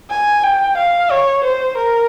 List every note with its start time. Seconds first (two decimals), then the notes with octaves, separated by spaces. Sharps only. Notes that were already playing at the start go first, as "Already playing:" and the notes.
0.11 G#5
0.44 G5
0.78 F5
1.11 C#5
1.44 C5
1.78 A#4